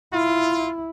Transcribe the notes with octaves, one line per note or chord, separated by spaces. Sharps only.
E4 F4